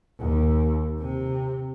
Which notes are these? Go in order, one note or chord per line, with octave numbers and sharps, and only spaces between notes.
D#2
C3